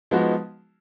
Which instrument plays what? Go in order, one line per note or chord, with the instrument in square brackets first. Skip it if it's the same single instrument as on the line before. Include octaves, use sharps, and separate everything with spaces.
[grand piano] F3 G#3 B3 D#4 F#4